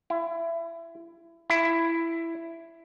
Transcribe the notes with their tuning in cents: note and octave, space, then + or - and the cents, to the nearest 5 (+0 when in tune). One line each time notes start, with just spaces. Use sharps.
E4 +25
E4 +10